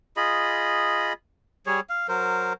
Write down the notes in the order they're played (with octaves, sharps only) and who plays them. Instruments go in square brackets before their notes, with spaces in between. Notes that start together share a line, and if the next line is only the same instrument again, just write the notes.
[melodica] F4 G#4 D#5 B5
G3 G#4 C#5
F5
F#3 A#4 C5